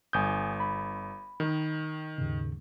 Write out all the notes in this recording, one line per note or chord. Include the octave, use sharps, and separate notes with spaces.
G1 G#5 D#6 G6
B5
D#3
D#2 G#2 C#3